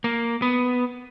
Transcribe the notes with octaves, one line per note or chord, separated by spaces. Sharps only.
A#3
B3